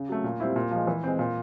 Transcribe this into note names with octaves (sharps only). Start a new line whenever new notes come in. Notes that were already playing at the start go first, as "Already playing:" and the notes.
Already playing: C#3
F#3 A3
A#2
G3 C4 E4
A#2
F3 G#3
E3
G#3 C4
A#2